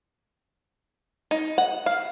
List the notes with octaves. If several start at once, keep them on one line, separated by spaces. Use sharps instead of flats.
D#4
F#5
F5